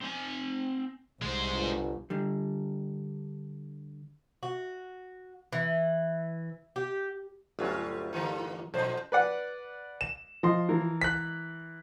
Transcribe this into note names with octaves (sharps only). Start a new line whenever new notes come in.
C4 G#5
C2 G#3 C5
G1
D3 G3
F#4
E3
G4
G1 D2 F#3 G3 C#4 F4
D3 E3 A#3
B1 E2 A2 C5
B4 D5 F#5
E7
F3 D#5 C6
E3 A#4
F#6 B6